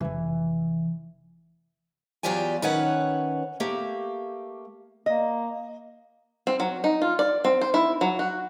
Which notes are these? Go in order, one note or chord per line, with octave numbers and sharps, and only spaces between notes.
F1 E3
E2 F#3 F4 G4 D5 G#5
D#3 C#4 B4 C#5 F#5
A3 A#3 G4
A#3 D#5
C4
F#3
D#4
F4
D5
C4
C5
E4
F#3
F#4